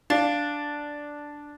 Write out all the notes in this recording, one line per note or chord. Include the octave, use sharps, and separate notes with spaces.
D4 F5 A6